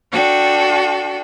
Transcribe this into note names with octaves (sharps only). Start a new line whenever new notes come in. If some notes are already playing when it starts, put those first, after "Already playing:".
D4 F#4 A4 G5